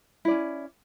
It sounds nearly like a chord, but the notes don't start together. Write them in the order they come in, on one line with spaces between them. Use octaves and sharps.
E4 D5 C#4